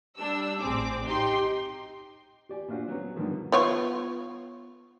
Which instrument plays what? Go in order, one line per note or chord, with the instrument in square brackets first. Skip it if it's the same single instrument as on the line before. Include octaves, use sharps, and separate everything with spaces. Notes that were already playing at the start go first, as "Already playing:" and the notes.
[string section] G3 D4 E6
A1 C4 G#4 D6
D#4 G4 G5 C6
[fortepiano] G4 D5 G#5
A#2 D4 F4 F#4 C5
F#3 B3 C#4
G2 B2 D3 D#3 F3
[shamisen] B3 F4 C#5